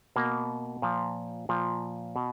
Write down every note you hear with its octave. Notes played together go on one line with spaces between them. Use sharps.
B2 A#3
A#2 F3
A#2 F3
B2